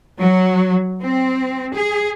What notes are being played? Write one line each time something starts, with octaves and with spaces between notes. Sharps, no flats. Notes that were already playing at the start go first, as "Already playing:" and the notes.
F#3
C4
G#4